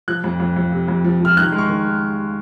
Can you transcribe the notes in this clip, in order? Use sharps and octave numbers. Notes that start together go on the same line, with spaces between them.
F3 F#6
F2
F2
F2
C3
F2
F3
F3
F6
D#3 F#6
G#3
C#6
D#3